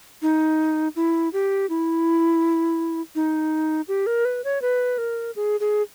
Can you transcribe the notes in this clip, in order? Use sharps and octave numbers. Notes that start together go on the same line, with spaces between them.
D#4
E4
G4
E4
D#4
G4
A#4
B4
C#5
B4
A#4
G#4
G#4